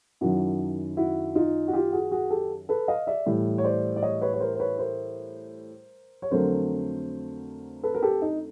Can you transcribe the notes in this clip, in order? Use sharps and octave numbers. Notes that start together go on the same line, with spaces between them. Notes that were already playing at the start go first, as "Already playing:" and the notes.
F#2 D#3 F#3 E4 F#4
E4 F#4
D#4 F4
F#4
F4 G4
F#4 G#4
F#4 G#4
G4 A4
A4 B4
D#5 F5
D5 E5
A2 E3 G3
C#5
C5 D5
D5
C#5 D#5
B4 C#5
C#5
A#4 C5
C5
B4 C#5
A#4 C5
C#5
F2 D3 F#3 A3 A#4 C5
A4 B4
A#4
G4 A4
D#4